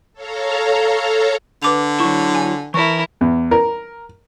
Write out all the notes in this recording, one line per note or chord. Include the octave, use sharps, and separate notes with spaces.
A4 C#5 F5 A#5
D3 B4 D6 F7
F#3 E4 C#6
G#5
E3 E4 A#4 A5 C#6
E2
A#4